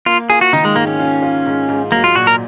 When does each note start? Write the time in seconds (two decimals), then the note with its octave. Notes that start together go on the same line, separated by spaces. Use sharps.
0.06 A#3 F4
0.30 F4 G#4
0.41 F#4
0.53 D#3 D#4
0.65 G#3
0.76 G#2 A#3
0.87 C#4
0.99 F4
1.22 F4
1.46 G#2
1.69 G#2
1.92 F#3 A#3
2.04 F4
2.15 A#2 F#4
2.27 A#4